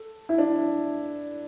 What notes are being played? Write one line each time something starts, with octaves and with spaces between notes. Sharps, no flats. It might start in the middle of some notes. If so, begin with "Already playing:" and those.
Already playing: A4
E4
D4